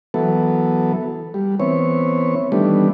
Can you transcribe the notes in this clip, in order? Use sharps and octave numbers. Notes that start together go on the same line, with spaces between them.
E3 F#3 B3 A4
G3
E3 B3 C4 C#5
D#3 E3 G3 A3 B3 D4